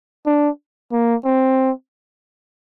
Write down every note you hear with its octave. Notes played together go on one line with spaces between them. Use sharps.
D4
A#3
C4